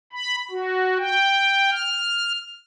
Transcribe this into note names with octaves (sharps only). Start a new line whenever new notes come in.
B5
F#4
G5
F6